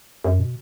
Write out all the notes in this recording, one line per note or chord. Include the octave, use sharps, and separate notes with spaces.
F#2
B2